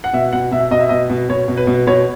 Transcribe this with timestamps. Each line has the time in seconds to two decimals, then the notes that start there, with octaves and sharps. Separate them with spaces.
0.04 F#5
0.13 B2 E5
0.33 B2 F#5
0.51 B2 E5
0.71 B2 D#5
0.81 E5
0.89 B2 D#5
1.10 B2
1.29 B2 C#5
1.48 B2
1.57 B4
1.67 B2
1.87 B2 C#5